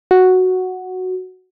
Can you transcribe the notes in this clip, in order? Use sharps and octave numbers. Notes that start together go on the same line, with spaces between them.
F#4